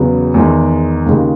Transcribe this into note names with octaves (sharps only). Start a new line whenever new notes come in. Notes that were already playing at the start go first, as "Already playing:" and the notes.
Already playing: E2 C#3 F#3 B3
E2 D#3 G#3
D#2 C#3 G#3